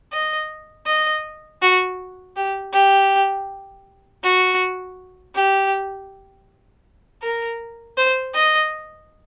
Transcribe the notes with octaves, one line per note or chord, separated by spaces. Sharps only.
D#5
D#5
F#4
G4
G4
F#4
G4
A#4
C5
D#5